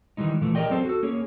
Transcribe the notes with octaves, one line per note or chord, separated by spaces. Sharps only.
D#3 E3 G3 G#3 D#4
A#2 E3 A3
G4 A#4 B4 D5 D#5 G5
F#3 C4 A4 C5
F#4 A4
A#3 C#4 G#4 C#5